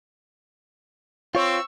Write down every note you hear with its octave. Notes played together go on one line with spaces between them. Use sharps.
C4 F4 C#5 C#6 E6